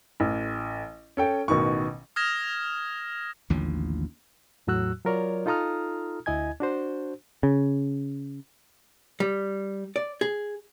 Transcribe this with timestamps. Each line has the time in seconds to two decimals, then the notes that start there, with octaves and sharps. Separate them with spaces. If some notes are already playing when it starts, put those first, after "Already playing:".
0.20 A1
1.17 C#4 A4 G5
1.48 A1 B2 D#3 C#6
2.16 D#6 F6 G#6 A#6 E7
3.50 A1 D#2 D3 F3
4.67 E2 A2 F#3 F#4 E6 F#6
5.05 F#3 F4 A#4 C#5 D5
5.46 D#4 F4 A4 A#5 D#6 F6
6.26 D2 E4 D#5 G#5 G#6
6.60 D4 F#4 C5
7.43 C#3
9.20 G3
9.96 D5
10.21 G#4